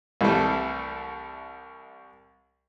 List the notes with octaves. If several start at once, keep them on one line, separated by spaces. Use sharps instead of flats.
C2 E3 G3 A3